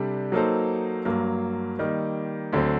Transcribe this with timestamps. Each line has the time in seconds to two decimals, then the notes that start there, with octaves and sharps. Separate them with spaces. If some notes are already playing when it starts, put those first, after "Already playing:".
Already playing: C3 G3 D4 A4
0.32 F#3 A#3 D#4 A4 C5
1.05 G2 F#3 A#3
1.79 D#3 G3 A#3
2.53 D2 D3 F#3 C4